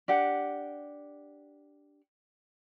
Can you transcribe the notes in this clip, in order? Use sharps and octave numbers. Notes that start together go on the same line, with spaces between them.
D4 G4 F#5